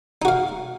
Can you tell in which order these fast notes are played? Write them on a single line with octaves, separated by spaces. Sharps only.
D#4 F#4 F5